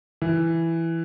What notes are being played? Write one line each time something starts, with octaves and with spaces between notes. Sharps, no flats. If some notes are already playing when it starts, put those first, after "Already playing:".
E3